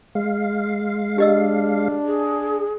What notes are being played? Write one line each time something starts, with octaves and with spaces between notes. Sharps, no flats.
G#3 F5
D4 G4 D#5 E6
G#4